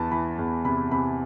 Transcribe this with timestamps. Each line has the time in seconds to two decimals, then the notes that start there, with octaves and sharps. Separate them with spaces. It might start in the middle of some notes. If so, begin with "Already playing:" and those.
Already playing: E2 E3 A5 B5
0.11 E3 B5
0.39 E2
0.65 C3 B5
0.91 C3 B5